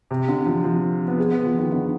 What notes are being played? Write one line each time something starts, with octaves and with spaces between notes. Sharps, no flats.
C3
D3
F3
F3
B3
G#3
B3
F3
D#3
D3